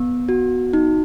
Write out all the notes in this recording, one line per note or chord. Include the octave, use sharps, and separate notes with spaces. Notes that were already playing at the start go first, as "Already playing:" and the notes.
Already playing: B3
F#4
D#4